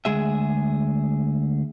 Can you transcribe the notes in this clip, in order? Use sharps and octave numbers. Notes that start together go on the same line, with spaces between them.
D2 G#3 G#4 E5